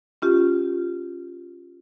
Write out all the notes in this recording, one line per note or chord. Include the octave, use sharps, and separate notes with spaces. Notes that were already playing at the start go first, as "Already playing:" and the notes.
C#4 F4 G4